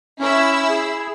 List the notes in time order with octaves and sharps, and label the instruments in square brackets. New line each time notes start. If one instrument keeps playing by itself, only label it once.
[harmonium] C#4 [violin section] E4 E6
[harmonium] G#4